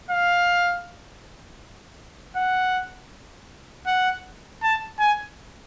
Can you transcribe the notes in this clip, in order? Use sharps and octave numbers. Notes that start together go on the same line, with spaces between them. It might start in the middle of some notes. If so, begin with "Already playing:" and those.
F5
F#5
F#5
A5
G#5